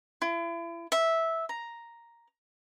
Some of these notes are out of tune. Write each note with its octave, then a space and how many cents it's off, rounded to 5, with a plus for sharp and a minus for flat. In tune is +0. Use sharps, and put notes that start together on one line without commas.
E4 +40
E5 -10
A#5 +5